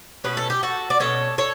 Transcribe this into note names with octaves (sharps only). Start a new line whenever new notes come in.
B2 A3 C#4 B4
A4
G4
F#4 A4
D5
B2 A3 C#4 A4 C#5
A4 C#5